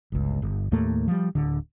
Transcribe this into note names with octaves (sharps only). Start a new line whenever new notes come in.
G1 C#2
G1
D#2 A2 A3 A#3
F3 G3
D1 D3